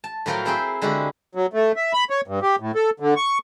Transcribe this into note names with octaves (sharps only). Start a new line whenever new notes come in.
A5
A2 F3 F#3 A#4 F5 G5
C4 E4 G#4 C5 E5 G5
D3 G#3 E4 F#4 G4
F#3
A3
E5
B5
C#5
G2
G4
A2
A4
D3
C#6